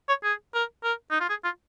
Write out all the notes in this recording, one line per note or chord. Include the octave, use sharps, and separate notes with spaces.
C#5
G#4
A#4
A#4
D#4
F4
G#4
F4